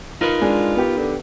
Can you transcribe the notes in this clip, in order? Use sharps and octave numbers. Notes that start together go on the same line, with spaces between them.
D#4 F4 A#4 B4
G#3 D4
B3 G4
D3